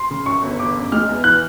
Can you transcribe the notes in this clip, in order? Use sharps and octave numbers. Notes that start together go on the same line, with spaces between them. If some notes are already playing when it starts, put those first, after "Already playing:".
Already playing: C6
C#3
F#2 C#6
G1
G1 D6
F#2
G#3 F6
E2
E3 F#6